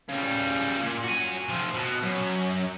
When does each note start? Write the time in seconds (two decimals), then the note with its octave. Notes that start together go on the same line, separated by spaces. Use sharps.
0.09 C#3 G3
0.78 A#2
1.04 F#4 G#5
1.49 C3 F3
1.75 B2
2.03 F#2